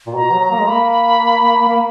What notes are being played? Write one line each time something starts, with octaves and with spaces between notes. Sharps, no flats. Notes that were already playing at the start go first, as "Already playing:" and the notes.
A#2
B2 A#5
F#3
A#3
G#3
A#3 B5
A#3